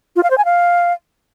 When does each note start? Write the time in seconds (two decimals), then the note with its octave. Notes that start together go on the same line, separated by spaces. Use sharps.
0.16 F4
0.23 F5
0.31 C5
0.38 G#5
0.45 F5